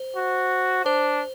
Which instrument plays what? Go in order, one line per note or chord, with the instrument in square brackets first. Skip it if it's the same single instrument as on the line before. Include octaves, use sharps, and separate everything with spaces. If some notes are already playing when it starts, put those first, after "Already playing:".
Already playing: [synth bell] C5
[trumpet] F#4
[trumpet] D4 [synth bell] C5